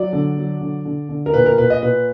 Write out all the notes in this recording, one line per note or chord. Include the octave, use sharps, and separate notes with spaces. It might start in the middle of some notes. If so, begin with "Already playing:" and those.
Already playing: F#3 D5
D3
F#3
D3
D3
D3
A#4
A#2 B4
A#4
A#2 B4
D#5
A#2 B4